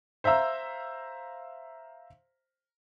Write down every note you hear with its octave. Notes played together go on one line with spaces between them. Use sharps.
C5 E5 F5 A#5 E6